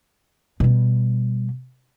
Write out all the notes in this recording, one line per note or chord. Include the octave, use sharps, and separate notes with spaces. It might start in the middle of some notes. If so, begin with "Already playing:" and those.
B2 G3